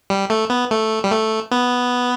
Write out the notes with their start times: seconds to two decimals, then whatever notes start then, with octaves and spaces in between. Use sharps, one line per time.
0.10 G3
0.30 A3
0.50 B3
0.71 A3
1.04 G3
1.11 A3
1.51 B3